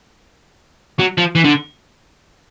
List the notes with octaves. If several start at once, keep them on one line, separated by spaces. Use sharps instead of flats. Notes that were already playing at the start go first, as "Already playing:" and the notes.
F#3
F3
E3
D3